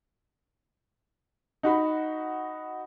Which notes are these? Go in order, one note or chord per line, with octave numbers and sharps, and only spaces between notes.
D#4 F#4 B5